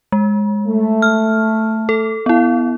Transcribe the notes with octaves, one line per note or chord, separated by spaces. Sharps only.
G#3
A3
F6
A4
B3 E4 F5